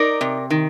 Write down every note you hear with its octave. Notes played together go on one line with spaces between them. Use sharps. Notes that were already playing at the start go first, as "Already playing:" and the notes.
Already playing: D#4 A#4 D5
C3
D#3